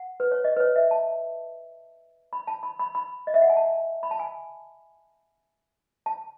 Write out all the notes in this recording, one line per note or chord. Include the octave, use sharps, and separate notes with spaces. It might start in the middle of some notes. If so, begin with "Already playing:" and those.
Already playing: F#5
B4
C#5
D#5
B4
C#5
E5
A5
B5
A5
B5
B5
B5
D#5
E5
F#5
G#5
A5
B5
A5
G#5
A5